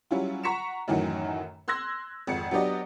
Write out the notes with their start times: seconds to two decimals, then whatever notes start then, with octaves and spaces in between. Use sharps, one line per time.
0.11 F#3 G3 C#4 E4 F4
0.43 F#5 A#5 C#6 B6 C#7 E7
0.88 F#2 A2 D#3 E3 F#3
1.68 C6 E6 F#6 G#6 A#6
2.27 G#1 F2 C#7
2.51 F#3 B3 D4 G4 D5 D#5